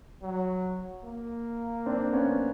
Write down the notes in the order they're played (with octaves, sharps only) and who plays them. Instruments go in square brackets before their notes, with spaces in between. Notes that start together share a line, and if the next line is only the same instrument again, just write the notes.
[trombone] F#3
A#3
[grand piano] C4 D4
B3 C#4